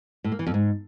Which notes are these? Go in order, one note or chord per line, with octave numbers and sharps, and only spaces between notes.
A2
A#3
E3
F2
G#2